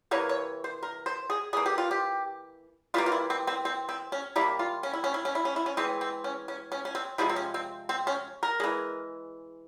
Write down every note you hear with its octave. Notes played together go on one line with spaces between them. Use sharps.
C3 E3 A#3 C#5
C#5
C5
A#4
C5
G#4
E3 A#3 G#4
G4
F4
G4
E3 G3 A#3 F4
F4
E4
C4
C4
C4
C4
C#4
C3 G3 A#3 E4
F4
C#4
E4
C#4
E4
C#4
E4
C#4
E4
C#4
E3 G#3 C4
C4
C#4
C#4
C#4
C#4
C4
C3 F3 G#3 E4
C4
C#4
C4
C4
C#4
A#4
E3 G#3